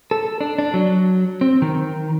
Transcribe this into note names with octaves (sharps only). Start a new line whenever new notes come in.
A4
D4
D4
F#3
C4
D#3